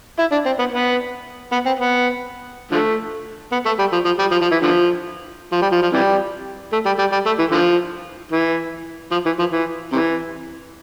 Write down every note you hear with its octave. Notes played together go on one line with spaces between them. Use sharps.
E4
D4
C4
B3
B3
B3
C4
B3
D3 F3 A3
B3
A3
G3
F3
F3
G3
F3
F3
E3
D3 F3
F3
G3
F3
F3
C3 E3 G3
A3
G3
G3
G3
A3
E3
D3 F3
E3
F3
E3
F3
E3
C3 E3